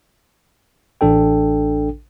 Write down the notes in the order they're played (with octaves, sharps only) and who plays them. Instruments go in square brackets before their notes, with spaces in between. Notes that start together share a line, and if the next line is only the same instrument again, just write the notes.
[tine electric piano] A1 D4 A4 G5